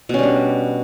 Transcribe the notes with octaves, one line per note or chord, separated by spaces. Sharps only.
B2 G3 C#4 D4